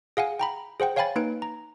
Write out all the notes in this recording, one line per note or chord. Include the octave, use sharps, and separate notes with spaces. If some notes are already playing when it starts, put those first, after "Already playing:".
G#4 F5 F#5 G#5
G5 A#5 B5
G#4 C5 F#5 G5
C#5 F5 G5 G#5 B5 A6
A#3 D#4 B4 D7
A#5